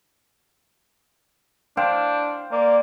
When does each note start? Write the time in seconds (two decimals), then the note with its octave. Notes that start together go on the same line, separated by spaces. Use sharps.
1.77 D4 C5 F5 G5
2.52 A#3 D5